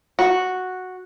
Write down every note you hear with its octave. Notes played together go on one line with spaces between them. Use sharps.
F#4